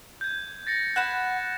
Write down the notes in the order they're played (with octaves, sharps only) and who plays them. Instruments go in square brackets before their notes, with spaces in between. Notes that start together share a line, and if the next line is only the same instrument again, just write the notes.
[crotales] G6 G#6
A6 A#6 C#7
[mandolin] F#5 B5 [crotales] F#6 G#6 E7